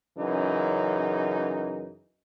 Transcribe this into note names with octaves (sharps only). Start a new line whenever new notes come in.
F#2 C#3 E3 D#4